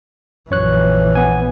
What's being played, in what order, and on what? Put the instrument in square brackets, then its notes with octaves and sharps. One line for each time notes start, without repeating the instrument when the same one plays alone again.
[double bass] A#1 E3 [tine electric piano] F#2 C#5 F#6
[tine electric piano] B3 G#5